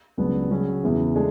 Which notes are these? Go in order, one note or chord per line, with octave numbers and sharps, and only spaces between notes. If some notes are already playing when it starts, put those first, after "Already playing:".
C#2 C#3 F#3 B3 D4
C#3 F#3 C#4 G#4
E2 C#3 E3
G#3 D4 A4